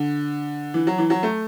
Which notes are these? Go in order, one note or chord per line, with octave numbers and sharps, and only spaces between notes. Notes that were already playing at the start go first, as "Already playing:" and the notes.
Already playing: D3
E3
F#3
E3
F#3
A3